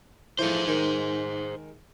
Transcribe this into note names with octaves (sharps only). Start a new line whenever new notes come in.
E3 F3 A3 G#4 C5
D#3 G#3